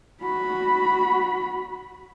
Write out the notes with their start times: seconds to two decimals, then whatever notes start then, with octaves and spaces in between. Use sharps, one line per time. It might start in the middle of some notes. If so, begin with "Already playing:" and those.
0.23 F#4 B5